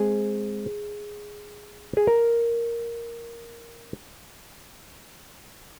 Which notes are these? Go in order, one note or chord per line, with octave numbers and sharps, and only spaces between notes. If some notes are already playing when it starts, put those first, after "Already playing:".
Already playing: G#3 C4 G#4
G#4
A#4